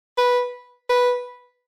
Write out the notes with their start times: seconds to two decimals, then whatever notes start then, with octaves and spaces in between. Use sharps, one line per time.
0.18 B4
0.90 B4